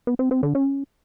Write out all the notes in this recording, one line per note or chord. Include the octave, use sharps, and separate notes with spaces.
B3
C4
C4
D3
C#4